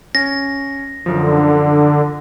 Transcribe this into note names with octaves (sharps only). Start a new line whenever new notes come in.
C#4 A#6
F#2 D3 F3